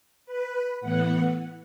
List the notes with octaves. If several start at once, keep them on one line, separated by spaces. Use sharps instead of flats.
B4
A2 E3 B3 F#5